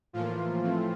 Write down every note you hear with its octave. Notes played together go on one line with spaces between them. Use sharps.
A2 E3 F3 A#3 F4
A2 E3 A3 C4